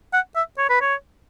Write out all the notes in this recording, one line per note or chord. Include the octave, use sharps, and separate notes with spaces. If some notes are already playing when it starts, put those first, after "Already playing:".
F#5
E5
C#5
B4
C#5